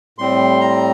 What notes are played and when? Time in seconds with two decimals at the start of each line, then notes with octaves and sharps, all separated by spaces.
0.18 A2 G3 C4 C6
0.60 A#5